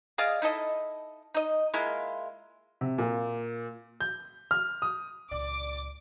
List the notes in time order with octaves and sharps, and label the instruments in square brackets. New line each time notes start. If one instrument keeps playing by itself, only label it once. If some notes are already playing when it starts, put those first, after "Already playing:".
[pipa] G#4 D5 D#5 F5
D#4 E4 A4 D#5
D#4 D#5
G#3 A#3 E4 F4
[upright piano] C3
A#2
G6
F6
D#6
[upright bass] C#2 A#2 [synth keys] D5 [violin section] D6